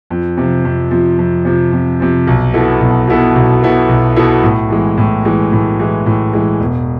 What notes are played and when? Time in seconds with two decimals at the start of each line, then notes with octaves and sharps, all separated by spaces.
0.10 F2
0.38 C3 F3
0.65 F2
0.91 C3 F3
1.18 F2
1.45 C3 F3
1.72 F2
2.00 C3 F3
2.27 B1
2.54 B2 B3 E4 A4
2.81 B1
3.08 B2 B3 E4 A4
3.35 B1
3.63 B2 B3 E4 A4
3.89 B1
4.16 B2 B3 E4 A4
4.43 A2
4.70 E3 G#3
4.98 A2
5.25 E3 G#3
5.53 A2
5.80 E3 G#3
6.06 A2
6.33 E3 G#3
6.60 E1